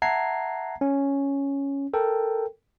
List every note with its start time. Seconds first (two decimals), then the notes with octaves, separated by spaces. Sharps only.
0.02 E5 F#5 A5 A#5 G#6 C7
0.81 C#4
1.94 A4 A#4 G5